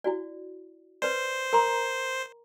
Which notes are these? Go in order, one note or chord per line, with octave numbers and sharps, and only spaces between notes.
E4 F#4 D5
B4 C5 D5
A#4 A#5 C6